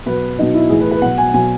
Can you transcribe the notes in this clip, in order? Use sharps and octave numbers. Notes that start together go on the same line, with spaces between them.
B2 F#3 B4
B2 F#3 D#4
E4
A2 E3 G#4
B4
B4
B2 F#3 F#5
G#5
B2 F#3 G#5